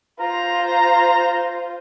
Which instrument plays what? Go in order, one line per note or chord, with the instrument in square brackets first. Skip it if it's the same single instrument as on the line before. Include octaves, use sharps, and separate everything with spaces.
[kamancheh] F4 C5 [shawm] A#5